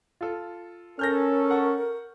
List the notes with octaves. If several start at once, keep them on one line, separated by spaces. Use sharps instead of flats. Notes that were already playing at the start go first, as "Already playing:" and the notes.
F4 A4
C#4 A4 A#4 F6 G6 A#6
F#5 C#6